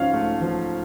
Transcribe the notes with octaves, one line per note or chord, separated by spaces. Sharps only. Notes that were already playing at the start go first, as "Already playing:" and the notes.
Already playing: G#2 F3 C#4 F5
A3
F3